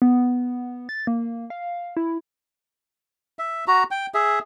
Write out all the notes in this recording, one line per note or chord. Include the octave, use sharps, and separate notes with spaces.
B3
A6
A#3
F5
E4
E5
F#4 A#5
G5
G#4 E5